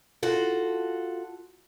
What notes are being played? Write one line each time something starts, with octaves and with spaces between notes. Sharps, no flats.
F4 F#4 A4